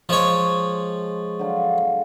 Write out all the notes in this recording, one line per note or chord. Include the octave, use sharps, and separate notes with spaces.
F3 G#3 C#5 A5
D3 F#3 F4